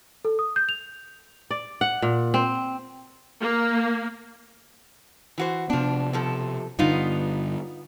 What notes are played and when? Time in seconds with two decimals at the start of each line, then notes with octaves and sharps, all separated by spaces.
0.25 A4
0.39 D#6
0.56 G6
0.69 F7
1.51 D5
1.81 F#5
2.02 A#2
2.34 C4
3.40 A#3
5.38 E3 F#4 C5
5.70 C3 F3 B3 D4
6.13 B2 F3 A4
6.79 G2 D3 B3 D#4 F4